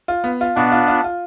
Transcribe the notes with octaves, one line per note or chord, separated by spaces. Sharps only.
F4
B3
F4
B2 B3 D4
F4
F4
F4